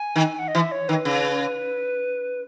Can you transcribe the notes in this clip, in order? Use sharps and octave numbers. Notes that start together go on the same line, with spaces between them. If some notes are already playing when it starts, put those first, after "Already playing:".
Already playing: G#5
D#3
F#5
D#5
E3 E5
C#5
D#3 B4
C#3